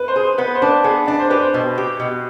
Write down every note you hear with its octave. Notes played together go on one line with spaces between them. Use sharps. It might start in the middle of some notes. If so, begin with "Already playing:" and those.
Already playing: B4
C5
G#4
C5
B3 B4
C5
D4 B4
B3 G#4
D4 D5
C5
G4 B4
C5
B2
G4
B2